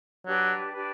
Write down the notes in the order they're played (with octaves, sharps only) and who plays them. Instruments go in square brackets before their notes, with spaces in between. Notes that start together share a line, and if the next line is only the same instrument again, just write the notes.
[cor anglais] F#3 [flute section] D4 G4 B4
[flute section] D4 G4 B4